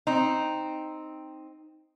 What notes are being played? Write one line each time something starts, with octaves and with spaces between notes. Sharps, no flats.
C4 D#4